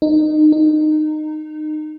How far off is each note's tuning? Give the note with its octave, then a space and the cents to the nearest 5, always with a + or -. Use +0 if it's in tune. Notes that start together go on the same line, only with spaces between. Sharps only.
D#4 -20
D#4 -20